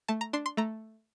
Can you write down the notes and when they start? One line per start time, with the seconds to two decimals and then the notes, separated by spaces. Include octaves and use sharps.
0.08 A3 A5
0.21 A#5
0.33 D4 C6
0.46 C6
0.57 A3 A#5